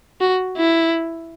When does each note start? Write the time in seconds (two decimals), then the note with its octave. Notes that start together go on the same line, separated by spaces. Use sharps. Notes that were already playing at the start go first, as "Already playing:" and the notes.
0.21 F#4
0.57 E4